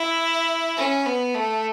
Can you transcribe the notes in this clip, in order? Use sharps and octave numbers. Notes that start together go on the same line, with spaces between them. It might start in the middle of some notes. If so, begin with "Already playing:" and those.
Already playing: E4
C#4
B3
A3